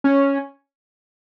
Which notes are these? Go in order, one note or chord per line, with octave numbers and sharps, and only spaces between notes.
C#4